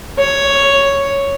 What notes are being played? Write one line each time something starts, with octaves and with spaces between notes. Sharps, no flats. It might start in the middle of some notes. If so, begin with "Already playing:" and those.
C#5